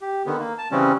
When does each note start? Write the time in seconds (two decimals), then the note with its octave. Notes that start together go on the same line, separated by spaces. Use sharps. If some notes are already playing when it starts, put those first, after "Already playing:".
0.01 G4
0.26 D3 D#3 B3
0.39 A#3
0.58 A5
0.72 C#3 E3 G3 C4 C#4